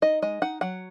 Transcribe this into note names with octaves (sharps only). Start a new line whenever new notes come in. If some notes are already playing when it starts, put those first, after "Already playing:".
D#4 D#5
G#3 D#5
D#4 F#5
F#3 F#5